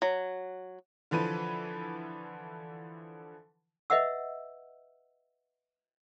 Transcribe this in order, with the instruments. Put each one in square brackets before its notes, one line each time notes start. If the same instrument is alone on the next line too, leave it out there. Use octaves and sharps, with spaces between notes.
[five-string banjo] F#3
[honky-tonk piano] D3 E3 F3 B4 D#7
[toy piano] B4 D#5 E5 F#5 E6